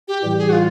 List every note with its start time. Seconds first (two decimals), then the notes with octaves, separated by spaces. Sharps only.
0.08 G4
0.23 A2 E3 G3 G4
0.38 G#4
0.49 F#4
0.53 F4